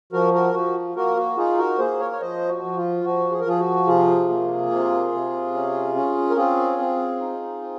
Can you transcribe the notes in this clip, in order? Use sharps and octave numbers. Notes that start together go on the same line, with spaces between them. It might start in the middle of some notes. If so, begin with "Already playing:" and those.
F3 F#4 A#4
F#4 A#4
F3 F#4
A#3 F#4 A#4
F#4
D#4 F4 G#4
F#4 A#4
A#3 G#4 C5
A#4 C#5
C#5
F3 C5 D#5
F#4
F3
F4
F3 F#4
G#4
A#4
F3 F4 G#4
F#4
C3 F4 G#4
A#3
C3
C3
C#4
C#4
A#4
C4 F4 G#4
C4
D#4
C4